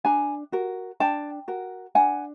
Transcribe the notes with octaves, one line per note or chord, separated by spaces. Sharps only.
D4 G#5 A#5
F#4 A#4
D4 G5 A5
F#4 A#4
D4 F#5 G#5